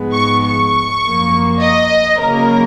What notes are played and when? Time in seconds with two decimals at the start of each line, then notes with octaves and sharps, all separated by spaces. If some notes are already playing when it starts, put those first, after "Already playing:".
Already playing: G#2 F3 G#3 B3
0.14 C#6
0.44 C#6
1.03 F#2 F3 A#3
1.61 D#5
2.20 C#3 F#3 A#3 A#4